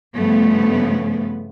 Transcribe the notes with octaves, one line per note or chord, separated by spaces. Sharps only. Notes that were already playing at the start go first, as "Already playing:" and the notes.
G2 C#3 F3 A3 B3